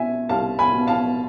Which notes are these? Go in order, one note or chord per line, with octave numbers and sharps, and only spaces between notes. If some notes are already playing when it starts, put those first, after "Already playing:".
Already playing: C2 B2 E5 G#5
C2 F5 A5
G#5 B5
B2
F5 A5